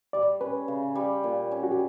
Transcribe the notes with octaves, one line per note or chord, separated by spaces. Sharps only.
G3 D5
C#4 B4
C#3
G3
A#2
C#4
F#4
G4